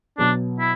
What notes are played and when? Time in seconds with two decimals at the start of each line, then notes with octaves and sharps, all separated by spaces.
0.18 B2 F#3 B3 D4
0.60 E4